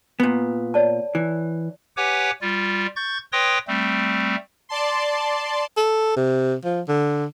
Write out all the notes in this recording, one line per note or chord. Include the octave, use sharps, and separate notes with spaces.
A#2 B3
C#5 D5 A5
E3
G4 B4 C#5 F#5 G#5 D6
G3 F4
C#6 G6 A6
B4 C#5 G5 C6 D#6 A#6
G3 A3 C4
D5 A5 C6
A4
C3
F3
D3